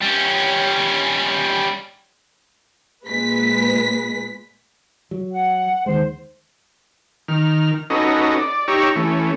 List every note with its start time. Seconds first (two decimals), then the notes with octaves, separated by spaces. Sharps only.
0.01 G3 C#4
3.06 A#2 G#3 B4 B6
5.11 F#3
5.31 F#5
5.86 D#2 D#3 G#3 C5
7.28 D#3 F6
7.90 C#4 D#4 F#4 A4 B4 D#5
8.38 D5
8.68 D#4 G4 C#5 A#5 C#6 E6
8.96 E3 A3 C#4